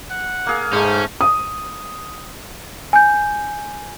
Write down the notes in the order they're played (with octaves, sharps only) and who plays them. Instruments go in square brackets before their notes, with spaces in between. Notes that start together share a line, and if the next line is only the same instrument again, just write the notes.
[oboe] F#5
[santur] A#3 G#4 F5
[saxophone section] G#2 [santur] A3 C5 [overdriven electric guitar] C#4
[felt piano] D#6
[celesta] G#5 G6